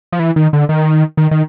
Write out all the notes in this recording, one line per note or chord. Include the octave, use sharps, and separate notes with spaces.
F3
E3
D#3
D3
D#3
D#3
D#3